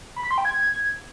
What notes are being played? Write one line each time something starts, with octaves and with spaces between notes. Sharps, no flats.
B5
B6
C6
G5
G#6